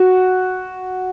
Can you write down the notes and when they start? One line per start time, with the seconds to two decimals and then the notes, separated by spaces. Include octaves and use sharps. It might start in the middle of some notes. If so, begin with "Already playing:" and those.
Already playing: F#4